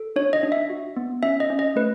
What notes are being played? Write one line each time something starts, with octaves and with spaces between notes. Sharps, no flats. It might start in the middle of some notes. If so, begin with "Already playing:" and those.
Already playing: A4
D4 C#5
D#5
D4
E5
F#4
B3
C#4 E5
D#5
C#4
D#5
A3 B4